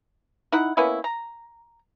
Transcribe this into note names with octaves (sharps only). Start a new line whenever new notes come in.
D#4 E4 F#5
A#3 B3 C#4 E4
A#5